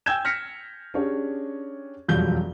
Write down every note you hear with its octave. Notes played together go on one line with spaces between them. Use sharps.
G5 G#5 E6 G6 G#6 E7
F6 A#6 B6 C#7
C#4 D4 G4 G#4 C#5
E1 F2 F#3 G3 F4 G6